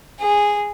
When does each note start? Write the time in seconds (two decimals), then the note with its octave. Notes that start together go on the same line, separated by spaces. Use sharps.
0.21 G#4